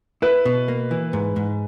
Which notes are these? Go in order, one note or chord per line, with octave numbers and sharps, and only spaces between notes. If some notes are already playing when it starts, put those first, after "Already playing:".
E4 B4
B2
A#3
E3
G#2
G#2